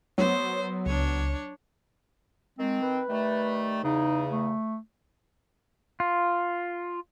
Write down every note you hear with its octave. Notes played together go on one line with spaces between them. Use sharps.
F#3 B3 C5 C#5
C#2 D4 C#5
D#3 G#3 C4
B4
D#3 G3 A3
E2 C#3 D#4
A3
F4